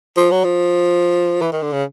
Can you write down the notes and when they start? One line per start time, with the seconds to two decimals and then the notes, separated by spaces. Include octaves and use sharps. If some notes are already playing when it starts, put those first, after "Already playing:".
0.17 F3
0.31 F#3
0.44 F3
1.41 E3
1.52 D#3
1.62 D3
1.73 C#3